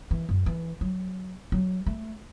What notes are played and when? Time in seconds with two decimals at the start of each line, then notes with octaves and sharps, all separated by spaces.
0.11 E3
0.29 F#2
0.46 E3
0.81 F#3
1.52 F#3
1.86 A3